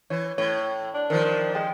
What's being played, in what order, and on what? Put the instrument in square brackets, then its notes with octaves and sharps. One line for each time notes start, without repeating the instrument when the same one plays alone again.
[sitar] E3 [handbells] C#5
[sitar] A2 [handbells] C#5
[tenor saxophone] D4
[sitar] D#3 F3 [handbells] A#4 C5
[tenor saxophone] G#3 [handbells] G#4 G5